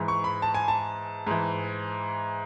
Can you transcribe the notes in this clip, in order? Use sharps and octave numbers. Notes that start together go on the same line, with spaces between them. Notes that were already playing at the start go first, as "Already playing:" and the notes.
Already playing: G#2 E3
C#6
B5
A5
G#5
A5
G#2 E3